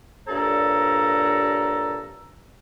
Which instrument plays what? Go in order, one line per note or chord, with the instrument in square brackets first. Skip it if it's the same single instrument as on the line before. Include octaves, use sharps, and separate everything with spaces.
[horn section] G2 A#2 A4 C#5 A#5